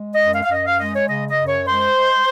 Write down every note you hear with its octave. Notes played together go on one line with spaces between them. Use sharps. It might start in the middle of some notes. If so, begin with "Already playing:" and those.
Already playing: G#3
D#5
F#2
F5
F5
F#2 D#5
F5
G#3 D#5
C#5
C#3 D#5
D#5
F#2
C#5
G#3 C5
G#3